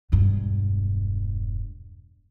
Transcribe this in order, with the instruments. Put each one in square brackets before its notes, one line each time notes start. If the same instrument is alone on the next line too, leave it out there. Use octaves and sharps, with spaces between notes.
[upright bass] E1 G2